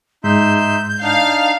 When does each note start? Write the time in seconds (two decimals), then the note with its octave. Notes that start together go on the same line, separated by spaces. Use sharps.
0.24 G#2 D#4 E5 C6 G6
1.02 D4 D#4 F5